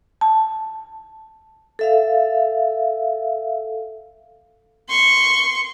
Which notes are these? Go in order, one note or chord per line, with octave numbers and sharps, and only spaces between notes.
A5
A4 E5 F5
C6 C#6